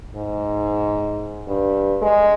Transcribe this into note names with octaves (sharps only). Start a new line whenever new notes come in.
G#2
G2
G#3